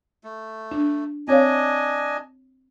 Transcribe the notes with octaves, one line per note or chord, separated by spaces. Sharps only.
A3
D4
C4 D4 C#5 D#5 F5 G#5